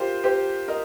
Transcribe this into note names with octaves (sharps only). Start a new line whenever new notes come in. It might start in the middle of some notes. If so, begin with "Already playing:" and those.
Already playing: F4 G4 A#4 C5
G4 C5
A#4 D#5